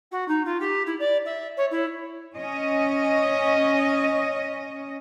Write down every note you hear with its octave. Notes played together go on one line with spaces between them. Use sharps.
F#4
D#4
F4
G4
E4
D5
E5
C#5
E4
C#4 D#5